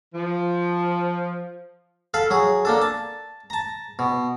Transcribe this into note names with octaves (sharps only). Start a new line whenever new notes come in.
F3
A4 F5 B5
F#3 G#4
A#3 D4 A4
A5
A5 A#5
B2